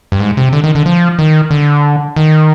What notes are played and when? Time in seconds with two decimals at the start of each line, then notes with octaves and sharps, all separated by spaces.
0.12 G2
0.20 G#2
0.37 C3
0.53 D3
0.64 D#3
0.75 D3
0.86 F3
1.19 D#3
1.51 D3
2.16 D#3